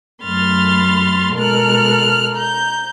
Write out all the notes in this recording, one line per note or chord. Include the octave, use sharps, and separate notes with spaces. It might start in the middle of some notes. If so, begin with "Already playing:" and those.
F#2 A3 B5 C6 F6 A6
B2 G#3 A4 A#4 F6 F#6
A#5 G6